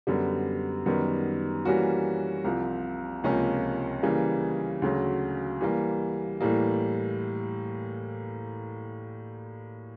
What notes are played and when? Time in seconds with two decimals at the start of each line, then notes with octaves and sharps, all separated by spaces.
0.07 F#2 D3 G3 B3
0.86 F#2 D#3 G3 B3
1.65 E3 G3 A#3 C#4 F#4
2.44 C2 C3 F3
3.24 C#2 C3 F3 A#3 C#4
4.03 C#3 E3 G3 A#3
4.82 D2 C#3 F#3
5.61 E3 G3 A#3
6.41 A2 E3 G3 A#3